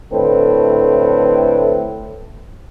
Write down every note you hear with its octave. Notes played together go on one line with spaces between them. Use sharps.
A2 D3 A3 C4 A4 B4